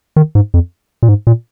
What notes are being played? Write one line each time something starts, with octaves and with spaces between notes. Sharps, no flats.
D#3
G#2
F2
A#2
G#2
A#2